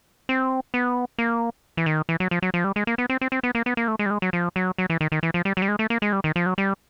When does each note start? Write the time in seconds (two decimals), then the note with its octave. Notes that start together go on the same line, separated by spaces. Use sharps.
0.29 C4
0.74 B3
1.18 A#3
1.77 E3
1.86 D#3
2.09 E3
2.20 F#3
2.31 F3
2.42 F#3
2.54 F3
2.64 G3
2.76 G#3
2.87 A#3
2.98 B3
3.09 C4
3.21 C4
3.32 C4
3.43 B3
3.55 A#3
3.66 B3
3.77 A#3
3.88 A3
3.99 G#3
4.06 G3
4.11 G#3
4.22 F#3
4.33 F3
4.56 F#3
4.78 F#3
4.90 E3
5.01 D#3
5.12 D#3
5.23 E3
5.34 F3
5.45 G3
5.57 F#3
5.62 G3
5.68 G#3
5.79 A3
5.90 A#3
6.02 G#3
6.13 G3
6.24 D#3
6.36 F3
6.46 F#3
6.58 G3